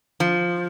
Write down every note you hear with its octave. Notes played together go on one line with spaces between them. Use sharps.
F3